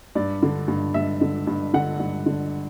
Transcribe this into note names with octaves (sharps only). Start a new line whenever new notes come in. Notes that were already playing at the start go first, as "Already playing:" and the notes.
G2 D5
D3
G2
G2 E5
D3
G2
D3 F#5
G2
D3